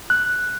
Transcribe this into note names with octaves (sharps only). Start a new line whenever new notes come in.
F#6